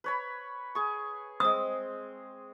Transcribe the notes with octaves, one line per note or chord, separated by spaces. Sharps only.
B4 C#5 B5
G#4 C#6
G#3 C4 D#6